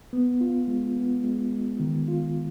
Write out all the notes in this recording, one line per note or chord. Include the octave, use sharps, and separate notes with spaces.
B3
F4
G#3
B3
G#3
G#3
D#3
F4